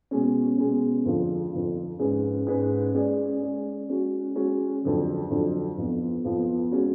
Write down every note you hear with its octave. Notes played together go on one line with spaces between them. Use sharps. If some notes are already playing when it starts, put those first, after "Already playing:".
B2 G#3 C#4
B2 G#3 C#4
F2 D3 F3
F2 D3 F3
G#2 G#3 C#4 G#4 B4
G#2 G#3 C#4 G#4 B4
G#3 C#4 G#4 D5
G#3 C#4 G#4 D5
G#3 C#4 F#4
G#3 C#4 F#4
F2 D3 F#3
F2 D3 F#3
F2 F3 B3 F4
F2 F3 B3 F4
G#3 C#4 F#4